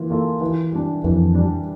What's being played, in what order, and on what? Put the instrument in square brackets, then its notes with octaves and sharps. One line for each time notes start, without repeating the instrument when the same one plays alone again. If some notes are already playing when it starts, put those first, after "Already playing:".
Already playing: [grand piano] E3 A#3 F4
A#3 F4 A4
E3
G3 D4
[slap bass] F2 [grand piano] E3
[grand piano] G3 D4